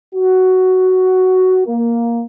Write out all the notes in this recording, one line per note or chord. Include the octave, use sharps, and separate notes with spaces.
F#4
A#3